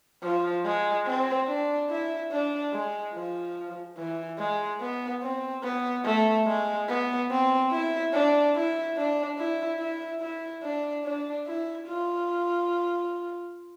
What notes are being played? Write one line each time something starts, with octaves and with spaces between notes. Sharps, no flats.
F3
G#3
C4
D4
E4
D4
G#3
F3
E3
G#3
B3
C4
B3
A3
G#3
B3
C4
E4
D4
E4
D4
E4
E4
E4
D4
D4
E4
F4